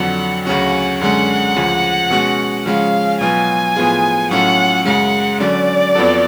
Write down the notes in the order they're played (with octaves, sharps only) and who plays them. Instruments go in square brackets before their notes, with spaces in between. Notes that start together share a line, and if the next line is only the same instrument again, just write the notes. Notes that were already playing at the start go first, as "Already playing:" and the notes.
Already playing: [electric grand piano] F2 D3 F#3 [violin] F#5
[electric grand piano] D2 C#3 F#3 C#4 F#4 [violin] F#5
[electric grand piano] F#2 D3 G#3 C#4 [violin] F#5
[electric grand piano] D2 C#3 F3
B2 G#3 C#4 F#4
[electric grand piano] C#3 F3 G#3 C#4 [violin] F5
[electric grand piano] B2 F#3 B3 F4 [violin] G#5
[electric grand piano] A2 F3 B3 F4 G#4
[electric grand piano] A2 F#3 C#4 F4 A4 [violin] F#5
[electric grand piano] F#2 C#3 G#3 [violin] F#5
[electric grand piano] D3 F#3 C#4 [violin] D5
[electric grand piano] F2 F3 B3 F#4 A4